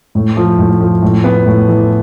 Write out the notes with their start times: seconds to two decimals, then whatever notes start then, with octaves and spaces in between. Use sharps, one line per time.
0.15 A2
0.37 F3
0.58 A2
0.80 F3
1.02 A2
1.24 B3
1.46 A2
1.68 E3